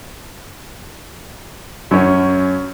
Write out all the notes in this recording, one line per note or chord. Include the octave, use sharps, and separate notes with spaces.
F#2 C#4